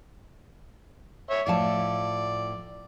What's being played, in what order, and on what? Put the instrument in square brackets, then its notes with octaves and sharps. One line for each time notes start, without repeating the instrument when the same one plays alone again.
[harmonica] C#5 E5
[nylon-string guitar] A2 F3 A5 [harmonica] D5